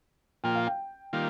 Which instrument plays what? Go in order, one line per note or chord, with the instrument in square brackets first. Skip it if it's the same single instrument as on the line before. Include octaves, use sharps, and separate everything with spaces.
[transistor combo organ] A#2 F3 A#3 F4 [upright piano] G5
[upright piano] F5
G5
[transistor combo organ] D#3 G3 A#3 F4